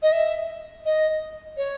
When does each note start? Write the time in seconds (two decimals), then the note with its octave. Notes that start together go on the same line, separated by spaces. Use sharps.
0.02 D#5
0.12 E5
0.85 D#5
1.57 C#5